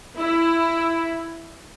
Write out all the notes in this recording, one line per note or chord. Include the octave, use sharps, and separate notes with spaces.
E4